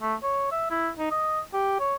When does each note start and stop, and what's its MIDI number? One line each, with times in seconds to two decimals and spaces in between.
0.01 0.15 57
0.23 0.51 73
0.51 0.68 76
0.71 0.89 64
0.98 1.09 63
1.11 1.40 75
1.53 1.77 67
1.80 1.95 73